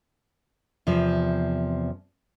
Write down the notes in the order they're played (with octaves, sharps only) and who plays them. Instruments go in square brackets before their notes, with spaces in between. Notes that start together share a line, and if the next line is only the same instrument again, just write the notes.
[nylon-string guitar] E2 C3 F3